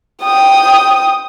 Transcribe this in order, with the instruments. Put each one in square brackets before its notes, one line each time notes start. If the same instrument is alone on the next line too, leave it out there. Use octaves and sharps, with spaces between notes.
[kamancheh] G5 D#6